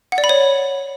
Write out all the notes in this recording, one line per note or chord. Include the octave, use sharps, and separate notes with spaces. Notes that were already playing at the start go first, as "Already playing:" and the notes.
F#5
D5
B5
C#5